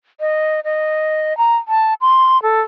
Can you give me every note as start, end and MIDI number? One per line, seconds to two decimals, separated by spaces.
0.20 0.60 75
0.64 1.36 75
1.38 1.57 82
1.68 1.94 81
2.01 2.41 84
2.43 2.61 69